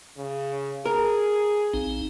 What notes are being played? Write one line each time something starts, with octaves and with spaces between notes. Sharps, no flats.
C#3
G#4 A#4
A#1 C4 D#4